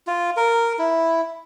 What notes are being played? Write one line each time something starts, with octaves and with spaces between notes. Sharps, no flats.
F4
A#4
E4